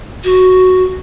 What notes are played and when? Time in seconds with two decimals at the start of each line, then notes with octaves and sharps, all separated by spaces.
0.24 F#4